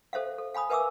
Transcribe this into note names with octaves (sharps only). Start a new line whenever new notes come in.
A4 C5 E5 F5
A4
F5 G#5 B5 D#6
A#4 B4 E5 G#5 D6 E6